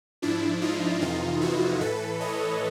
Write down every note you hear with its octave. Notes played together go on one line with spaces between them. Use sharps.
G#2 F3 D4 E4
D#4 F4
F2 C3 E3 D#4 F4
E4 F#4
A2 E3 A4 B4
C#5 D#5